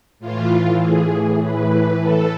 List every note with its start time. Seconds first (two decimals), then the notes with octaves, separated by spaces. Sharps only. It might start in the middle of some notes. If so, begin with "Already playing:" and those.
0.19 A2 E3 F4
0.80 G#4
1.41 B4
2.00 A4